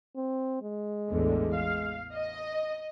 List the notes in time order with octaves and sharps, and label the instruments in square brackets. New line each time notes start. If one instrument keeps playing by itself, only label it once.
[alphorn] C4
G#3
[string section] A1 E2 D3
F5
D#5